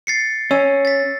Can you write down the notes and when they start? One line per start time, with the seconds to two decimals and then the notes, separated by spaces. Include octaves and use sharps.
0.07 A6 C7 C#7
0.51 C#4 E6
0.85 A6 B6